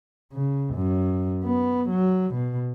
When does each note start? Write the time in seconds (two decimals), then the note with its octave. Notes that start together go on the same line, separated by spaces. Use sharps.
0.33 C#3
0.75 F#2
1.44 B3
1.90 F#3
2.35 B2